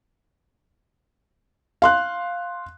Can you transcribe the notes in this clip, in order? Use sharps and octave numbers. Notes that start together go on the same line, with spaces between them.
F5 C6 F#6